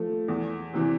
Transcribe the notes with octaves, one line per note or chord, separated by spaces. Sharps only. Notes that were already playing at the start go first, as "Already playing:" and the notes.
Already playing: F3 A3
E2
C3 E3